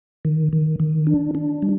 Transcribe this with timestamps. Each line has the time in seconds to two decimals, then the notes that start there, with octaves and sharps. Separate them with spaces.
0.25 D#3
0.53 D#3
0.80 D#3
1.07 D4
1.35 D4
1.62 G3